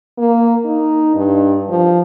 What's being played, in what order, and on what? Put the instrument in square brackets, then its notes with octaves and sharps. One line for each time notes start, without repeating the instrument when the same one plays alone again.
[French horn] A#3
D#4
G2
F3